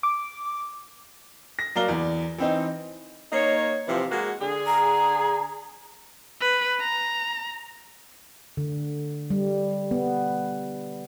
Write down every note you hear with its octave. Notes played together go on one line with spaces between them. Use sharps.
D6
A#6
F#3 A#3 D5 F5 A#5 G7
E2 D5
E3 C4 D#4
A#3 D#4 C#5
C3 E3 F3
G#3 A#3 F#4
D3 G#4
A#5
B4
A#5
D3
G3
B3